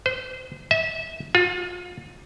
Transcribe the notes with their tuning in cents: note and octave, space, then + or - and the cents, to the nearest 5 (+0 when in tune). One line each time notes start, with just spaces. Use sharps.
C5 -35
E5 -30
F4 +35